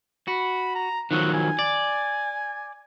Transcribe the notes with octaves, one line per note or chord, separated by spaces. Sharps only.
F#4 B5
A#5
D#3 F3 F#3 F#4
G#5
D5